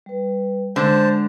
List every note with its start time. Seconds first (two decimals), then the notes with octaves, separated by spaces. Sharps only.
0.06 G3 B4
0.76 D3 G#3 C5 A5